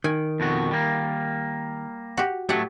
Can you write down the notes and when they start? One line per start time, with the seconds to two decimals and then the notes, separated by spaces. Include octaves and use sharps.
0.04 D#3 G#5
0.40 F2 B2 F#4
0.71 G3 A#3
2.17 F#4 G4
2.49 A2 F#3 A3 G4 F#5